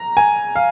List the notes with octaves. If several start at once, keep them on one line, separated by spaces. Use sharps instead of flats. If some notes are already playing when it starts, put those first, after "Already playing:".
Already playing: A#5
G#5
F5